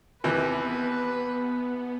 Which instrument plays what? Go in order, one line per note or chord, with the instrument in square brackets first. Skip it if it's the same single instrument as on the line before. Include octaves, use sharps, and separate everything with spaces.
[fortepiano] D#2 C3 E3 [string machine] B3 [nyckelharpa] B4